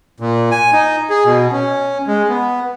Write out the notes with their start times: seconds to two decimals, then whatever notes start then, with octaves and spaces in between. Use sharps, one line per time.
0.20 A#2
0.51 G#5
0.73 D#4
1.10 G#4
1.25 B2
1.52 C#4
2.07 G#3
2.29 B3